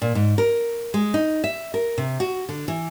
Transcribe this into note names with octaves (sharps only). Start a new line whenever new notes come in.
A#2
G#2
A#4
G#3
D#4
E5
A#4
C3
F#4
D3
E3